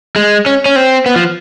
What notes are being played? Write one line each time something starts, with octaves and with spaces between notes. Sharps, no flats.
G#3
C#4
C#4
C4
B3
F3